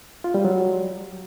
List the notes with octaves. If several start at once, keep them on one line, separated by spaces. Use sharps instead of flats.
F4
G3
F#3